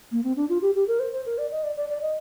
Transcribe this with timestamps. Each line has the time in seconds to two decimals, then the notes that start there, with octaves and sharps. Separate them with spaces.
0.12 A#3
0.24 C4
0.36 D4
0.49 F4
0.62 G4
0.75 G4
0.88 A#4
1.00 C5
1.13 C5
1.26 A#4
1.38 D5
1.51 D#5
1.63 D5
1.76 D5
1.89 D5
2.02 D#5